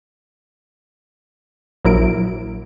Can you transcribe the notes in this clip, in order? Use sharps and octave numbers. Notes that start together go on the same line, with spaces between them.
A#1 F#3 E4 A#4 D7